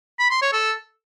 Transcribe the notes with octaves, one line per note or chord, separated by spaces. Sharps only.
B5
C6
C#5
A4